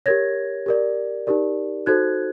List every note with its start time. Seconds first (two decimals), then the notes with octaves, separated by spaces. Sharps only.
0.06 G4 A#4 C#5 G#6 A#6
0.66 G4 A#4 D5
1.27 D#4 G4 A#4 D5
1.86 D#4 F#4 A4 C5 F#6 G#6